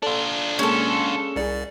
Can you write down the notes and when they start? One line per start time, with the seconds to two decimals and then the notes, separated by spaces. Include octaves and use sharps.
0.02 D4 F4 A4 D5
0.59 G#3 A#3 C#4 G#4 A4
1.36 C2 G#4 A#4 D5